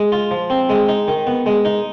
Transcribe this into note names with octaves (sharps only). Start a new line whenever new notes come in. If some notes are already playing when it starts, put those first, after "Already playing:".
Already playing: G#3
F4
F3
C4
G#3
D#4
D#3
B3
G#3
D#4